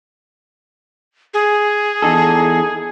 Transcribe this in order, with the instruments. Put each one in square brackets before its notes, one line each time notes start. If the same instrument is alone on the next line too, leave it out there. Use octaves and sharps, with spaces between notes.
[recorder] G#4
[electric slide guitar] E2 D#4 A4